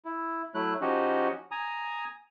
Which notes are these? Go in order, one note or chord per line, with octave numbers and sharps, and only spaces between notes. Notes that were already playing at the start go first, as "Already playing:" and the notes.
E4
F#3 A3 E4 F#6
F3 C#4 D#4 F#4 G4
G#5 A#5 D#6